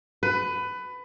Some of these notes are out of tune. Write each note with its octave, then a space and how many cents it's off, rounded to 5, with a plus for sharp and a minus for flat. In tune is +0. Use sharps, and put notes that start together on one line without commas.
B4 +20